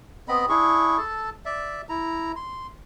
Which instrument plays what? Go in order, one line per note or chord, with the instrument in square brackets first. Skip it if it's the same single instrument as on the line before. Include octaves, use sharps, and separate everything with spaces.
[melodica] B3 C4 D#5 B5
D4 E4 G#4 C#6
A4 A5
D5 E5
E4 A#5
C6